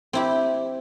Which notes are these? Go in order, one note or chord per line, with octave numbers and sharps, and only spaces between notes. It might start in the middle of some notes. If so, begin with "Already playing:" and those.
C4 E4 G4